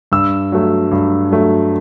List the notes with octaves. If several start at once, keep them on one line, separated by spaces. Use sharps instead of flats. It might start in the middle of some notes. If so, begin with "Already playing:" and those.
G2 E6
F#3 A3
G2
F#3 A3